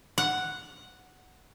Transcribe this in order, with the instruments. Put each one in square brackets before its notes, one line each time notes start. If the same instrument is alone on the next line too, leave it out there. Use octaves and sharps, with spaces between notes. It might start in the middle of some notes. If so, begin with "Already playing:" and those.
[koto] F#5